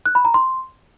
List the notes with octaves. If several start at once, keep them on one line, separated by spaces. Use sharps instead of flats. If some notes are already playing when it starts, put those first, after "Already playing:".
F#6
B5
A#5
C6